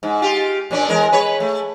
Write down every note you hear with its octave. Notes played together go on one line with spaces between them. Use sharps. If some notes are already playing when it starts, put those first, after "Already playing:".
G#2
F4 G4
A#2 C#4 D4
E2 G#3 A#4
B4 C#5
A3